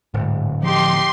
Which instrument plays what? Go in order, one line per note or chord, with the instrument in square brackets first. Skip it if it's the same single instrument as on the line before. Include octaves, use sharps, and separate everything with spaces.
[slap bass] D1 [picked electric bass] G#2
[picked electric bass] F3 [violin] D#4 G4 [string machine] C6